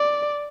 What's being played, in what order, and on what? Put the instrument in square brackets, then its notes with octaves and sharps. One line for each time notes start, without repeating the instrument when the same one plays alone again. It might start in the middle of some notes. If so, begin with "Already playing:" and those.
Already playing: [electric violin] D5